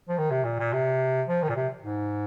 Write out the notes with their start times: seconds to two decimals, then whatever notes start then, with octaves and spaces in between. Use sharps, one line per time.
0.09 F3
0.18 D#3
0.31 C3
0.44 A#2
0.59 A#2
0.73 C3
1.28 F3
1.42 D#3
1.49 A#2
1.55 C3
1.83 G#2